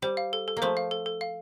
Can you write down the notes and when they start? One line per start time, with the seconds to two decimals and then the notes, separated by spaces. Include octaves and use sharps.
0.02 G3 C5
0.17 F5
0.33 A4
0.48 A4
0.57 A#3
0.62 F3 A3 C5
0.77 F5
0.91 A4
1.06 A4
1.21 F5